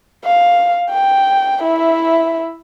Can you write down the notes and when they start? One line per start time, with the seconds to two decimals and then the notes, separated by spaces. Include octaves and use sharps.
0.25 F5
0.90 G5
1.63 E4 E5